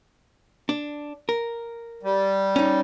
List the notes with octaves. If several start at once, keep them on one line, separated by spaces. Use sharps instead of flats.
D4
A#4
G3
C#4 D#4